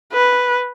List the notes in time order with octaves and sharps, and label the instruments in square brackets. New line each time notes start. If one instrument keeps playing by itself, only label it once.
[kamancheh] B4